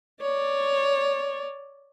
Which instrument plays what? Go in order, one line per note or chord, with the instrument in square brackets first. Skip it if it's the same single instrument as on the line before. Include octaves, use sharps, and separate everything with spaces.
[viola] C#5 D5